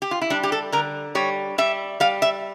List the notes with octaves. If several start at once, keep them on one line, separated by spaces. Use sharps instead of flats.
G4
F4
E4
G3 D4
G4
A4
D3 A#4
G3 C#5
G3 E5
G3 F5
E5